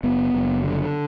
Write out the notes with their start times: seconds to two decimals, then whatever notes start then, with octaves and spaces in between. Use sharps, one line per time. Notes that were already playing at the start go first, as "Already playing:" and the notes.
0.03 F#1 B3
0.34 F#1
0.64 D3